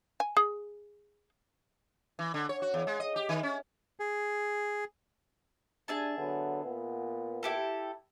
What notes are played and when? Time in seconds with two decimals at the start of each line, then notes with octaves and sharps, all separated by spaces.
0.20 G#5
0.37 G#4
2.19 E3
2.34 D3
2.49 C#5
2.62 F#4
2.74 E2
2.87 G#3
3.00 D#5
3.16 G4
3.29 D#3
3.43 C#4
4.00 G#4
5.88 D4 G#4 E5 A5
6.17 D3 F#3 B3
6.63 A#2 B3
7.43 E4 G4 A4